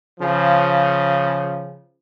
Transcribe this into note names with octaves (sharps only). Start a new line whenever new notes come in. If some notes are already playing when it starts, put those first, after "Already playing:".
C#3 F3